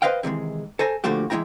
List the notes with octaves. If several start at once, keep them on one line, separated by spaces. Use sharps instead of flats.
B4 C5 D#5 F5 G5
C3 D#3 E3 G#3
A4 C5 G#5 A#5
A#2 D3 F3 A3 F#4 G4
E3 G#3 A3 E4 G5 A#5